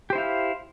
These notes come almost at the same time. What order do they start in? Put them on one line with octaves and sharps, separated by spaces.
G4 C5 E4 F5